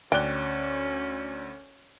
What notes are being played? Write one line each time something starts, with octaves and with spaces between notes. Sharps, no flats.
D2 C#4 D5 G5 F#6 G7